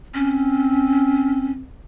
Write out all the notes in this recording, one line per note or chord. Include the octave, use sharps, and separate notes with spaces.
C4 C#4